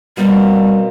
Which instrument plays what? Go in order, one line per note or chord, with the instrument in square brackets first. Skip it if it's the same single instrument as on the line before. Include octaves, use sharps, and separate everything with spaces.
[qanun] B2 A#3 C4 [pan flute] G3